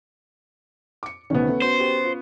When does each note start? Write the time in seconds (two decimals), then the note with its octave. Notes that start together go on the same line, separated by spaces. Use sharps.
1.03 D6 C#7
1.30 D2 C3 D#3 B3 C#4
1.48 A3
1.62 F#4 C5
1.78 F#4 G4
2.05 F4